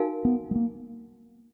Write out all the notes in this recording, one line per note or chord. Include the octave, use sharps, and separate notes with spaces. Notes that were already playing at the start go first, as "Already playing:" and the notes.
Already playing: D#4 F#4 A#4 F5 G#5
B3
G#3
A#3